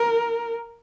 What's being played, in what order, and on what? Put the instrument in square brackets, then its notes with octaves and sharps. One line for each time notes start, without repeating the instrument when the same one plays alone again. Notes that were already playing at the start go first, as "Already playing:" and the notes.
Already playing: [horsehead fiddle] A#4